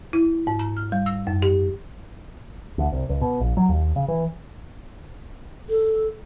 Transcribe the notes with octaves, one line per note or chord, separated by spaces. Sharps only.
E4
G#2
A#5
F6
G3
E6
F#2
G4
D2
C2
C#2
B2
A#1
F#3
D#2
C#3
E3
A4